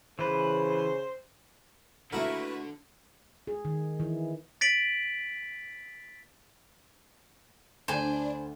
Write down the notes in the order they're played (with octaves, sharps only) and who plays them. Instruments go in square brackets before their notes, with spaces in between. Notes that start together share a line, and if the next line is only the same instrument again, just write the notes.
[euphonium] C#3 [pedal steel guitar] E3 B4 [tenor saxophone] C5
[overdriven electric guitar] D3 [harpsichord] A3 F#4 [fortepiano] A#3 E4 A#4 [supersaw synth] B4
[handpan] G#4
D#3
E3
[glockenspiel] A6 B6 D7 F#7
[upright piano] D2 [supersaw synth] D4 [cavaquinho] C5 G#5